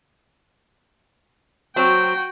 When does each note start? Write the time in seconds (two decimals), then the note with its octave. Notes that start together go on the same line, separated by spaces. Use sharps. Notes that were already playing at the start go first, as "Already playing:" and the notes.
1.76 F#3 C4 F#4 G5